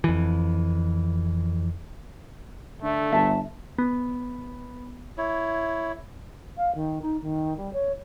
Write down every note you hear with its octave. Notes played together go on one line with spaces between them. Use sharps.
F2 E3
D3 A3
G1 E5 A5
B3
E4 C#5
F5
D#3
D#4
D#3
G3
C#5